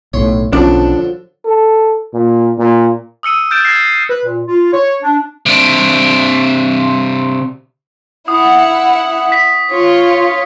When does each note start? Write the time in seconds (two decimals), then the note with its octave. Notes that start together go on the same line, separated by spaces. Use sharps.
0.14 B1 A2 C#5 C6
0.53 B1 D3 F3 F#3 C#4 D4
1.45 A4
2.14 A#2
2.59 A#2
3.23 D#6 E6 C#7 D#7
3.51 F6 G6 A6 D7 E7
3.65 G#6 A#6 C7
4.09 B4
4.25 A#2
4.47 F4
4.73 C#5
5.02 D4
5.46 C3 D4
8.28 E4 F#5 D#6
9.32 B6
9.70 F4 C#5